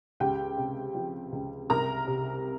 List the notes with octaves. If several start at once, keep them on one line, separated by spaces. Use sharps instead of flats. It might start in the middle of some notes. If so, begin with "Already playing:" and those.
C#2 G4 G5
C3
F3
C#2
C2 A#4 A#5
C3